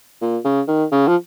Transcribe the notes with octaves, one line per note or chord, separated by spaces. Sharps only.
A#2
C#3
D#3
C#3
F3